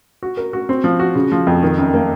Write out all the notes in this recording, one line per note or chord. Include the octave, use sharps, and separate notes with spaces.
F#4
A#4
F#4
C4
F3
F#4
C#3
F3
F2
D#3
F#2
A#3